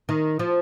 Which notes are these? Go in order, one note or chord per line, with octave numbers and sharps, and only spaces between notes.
D#3
F3